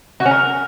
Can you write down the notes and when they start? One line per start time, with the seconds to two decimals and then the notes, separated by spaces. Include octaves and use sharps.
0.20 F#4
0.25 C#4
0.31 A#4